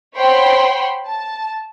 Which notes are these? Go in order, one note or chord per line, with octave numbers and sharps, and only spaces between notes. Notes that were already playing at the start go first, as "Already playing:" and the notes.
C5 C#5 F#5 G5 B5 C6
A5